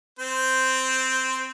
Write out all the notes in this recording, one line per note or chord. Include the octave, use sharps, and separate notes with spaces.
C4 C5